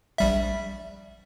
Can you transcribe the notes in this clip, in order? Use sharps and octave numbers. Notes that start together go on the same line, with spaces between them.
A#1 G3 E5